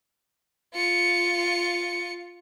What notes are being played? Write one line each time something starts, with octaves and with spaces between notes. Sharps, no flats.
F4 C#7